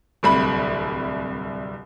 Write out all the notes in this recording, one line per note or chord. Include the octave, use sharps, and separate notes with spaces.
D1 C2 B5